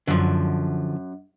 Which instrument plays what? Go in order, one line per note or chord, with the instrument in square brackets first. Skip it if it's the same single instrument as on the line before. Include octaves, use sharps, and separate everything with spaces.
[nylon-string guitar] F#2 [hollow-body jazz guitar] D3 F3